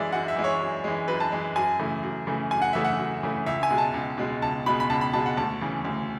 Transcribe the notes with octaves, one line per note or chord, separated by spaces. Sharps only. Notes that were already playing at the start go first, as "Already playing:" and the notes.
Already playing: F#2 E3 G#3 D5 E5
F#2 F#5
E5
E3 G#3
C#5
F#2
E3 G#3
F#2 B4
A5
E3 G#3
F#2 G#5
C#3 E3 A3
F#2
C#3 E3 A3
F#2 G#5
F#5
C#3 E3 A3 E5
F#5
F#2
C#3 E3 A3
C#2 E5
G#5
B2 G#3
A5
C#2
B2 G#3
C#2 A5
B2 G#3 B5
B5
C#2 A5
B5
B2 G#3 A5
F#5
D2 A5
C#3 E3
D2